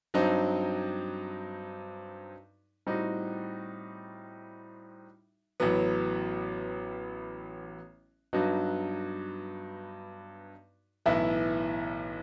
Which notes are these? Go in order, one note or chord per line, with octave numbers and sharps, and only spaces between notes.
G2 F#3 C4 D#4
A2 G3 C4 D#4 F#4
A1 A2 F#3 B3
G2 F#3 B3 D#4 F#4
B1 A2 E3 B3 E4